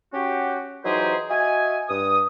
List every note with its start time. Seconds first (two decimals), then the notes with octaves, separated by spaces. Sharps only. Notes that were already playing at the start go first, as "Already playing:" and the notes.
0.13 C#4 F#4 G4
0.85 E3 F#3 D#4 G4 G#4 C5
1.30 F#4 D#5 E5 G#5
1.88 G2 D#6